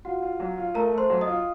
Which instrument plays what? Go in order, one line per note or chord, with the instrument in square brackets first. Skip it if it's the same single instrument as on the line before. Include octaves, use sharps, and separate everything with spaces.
[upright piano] F4 [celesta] F#4 F#5
[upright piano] F4
F#3
F4
[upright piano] A3 [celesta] A#4 A#5
[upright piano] A3
[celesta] C5 C6
[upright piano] F#3
[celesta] D#5 D#6
[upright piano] F4